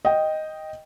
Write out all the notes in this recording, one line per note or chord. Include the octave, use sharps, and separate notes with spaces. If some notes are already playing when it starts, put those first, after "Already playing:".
D#5 G5